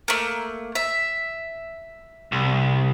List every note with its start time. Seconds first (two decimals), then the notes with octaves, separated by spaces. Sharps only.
0.08 A3 A#3
0.75 E5
2.32 C2